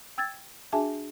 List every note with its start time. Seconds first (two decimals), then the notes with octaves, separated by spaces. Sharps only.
0.18 G5 E6 G#6 A6
0.73 D4 F#4 G#4 E5 G#5 A5